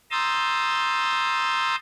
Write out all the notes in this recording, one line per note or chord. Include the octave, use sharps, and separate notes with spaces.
A#5 C6 D#6 E6 G6 A6